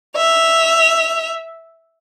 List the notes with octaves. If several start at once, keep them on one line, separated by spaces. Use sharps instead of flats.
E5 F7